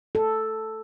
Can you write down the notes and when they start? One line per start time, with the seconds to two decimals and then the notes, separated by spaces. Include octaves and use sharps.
0.15 A4